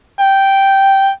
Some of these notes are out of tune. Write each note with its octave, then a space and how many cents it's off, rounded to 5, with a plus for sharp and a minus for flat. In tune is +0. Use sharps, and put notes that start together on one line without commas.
G5 -5